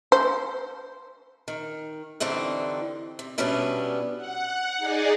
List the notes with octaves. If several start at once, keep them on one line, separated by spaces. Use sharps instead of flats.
C5
D#3
G2 D3 E3 C4 D#4
C3
B2 G3 B3 C#4 D4 E4
F#5
D#4 G#4 D5